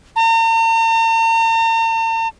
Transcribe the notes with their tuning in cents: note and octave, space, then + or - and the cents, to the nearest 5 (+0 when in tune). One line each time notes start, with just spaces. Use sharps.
A#5 -45